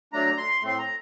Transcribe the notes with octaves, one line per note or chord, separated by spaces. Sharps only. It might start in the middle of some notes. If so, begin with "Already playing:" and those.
F#3 A3 D4 A#5
C6
A2 A3 C4 C6
A#5